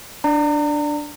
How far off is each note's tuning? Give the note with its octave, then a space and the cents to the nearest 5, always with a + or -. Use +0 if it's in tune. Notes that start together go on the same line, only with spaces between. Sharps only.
D4 +0 D5 +0 A#5 -35